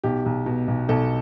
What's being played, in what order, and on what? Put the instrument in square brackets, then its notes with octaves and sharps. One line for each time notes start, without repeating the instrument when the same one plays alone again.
[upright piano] B1 G4
B1
B2
B1
B1 A4